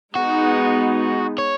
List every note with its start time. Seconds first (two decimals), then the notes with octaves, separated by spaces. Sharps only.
0.15 G#3 B3 D#4 F#4
1.38 C#5